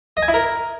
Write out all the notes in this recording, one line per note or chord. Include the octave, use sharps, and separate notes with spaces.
D#5
G#5
E4
A#4